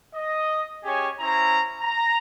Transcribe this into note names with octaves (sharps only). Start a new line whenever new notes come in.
D#5
C#4 G4 G#4 C#5 G#5
C#4 E4 C5 A#5
A#5